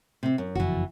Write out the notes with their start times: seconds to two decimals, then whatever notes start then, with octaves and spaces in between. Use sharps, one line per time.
0.23 C3 C4
0.38 F#2
0.55 F#1 F2 E3 F#4